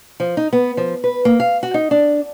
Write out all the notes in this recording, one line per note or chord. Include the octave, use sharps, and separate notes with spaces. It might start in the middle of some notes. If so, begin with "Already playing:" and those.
F3
D#4
B3
F3
B4
A#3
F5
F#4
D#4
D4